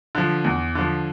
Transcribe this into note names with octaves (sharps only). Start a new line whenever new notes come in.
D3 F3
E2
D3 F3